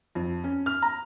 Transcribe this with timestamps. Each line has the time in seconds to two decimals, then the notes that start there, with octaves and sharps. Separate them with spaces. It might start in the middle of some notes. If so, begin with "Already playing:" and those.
0.15 F2
0.44 C#4
0.66 F6
0.82 A#5